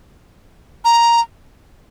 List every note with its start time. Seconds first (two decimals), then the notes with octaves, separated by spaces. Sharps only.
0.85 A#5